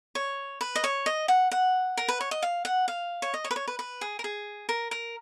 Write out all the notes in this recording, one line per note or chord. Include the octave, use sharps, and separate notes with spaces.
C#5
B4
D#5
C#5
D#5
F#5
F#5
A#4
B4
C#5
D#5
F5
F#5
F5
C#5
D#5
C#5
B4
C#5
B4
B4
G#4
A#4
G#4
A#4
A#4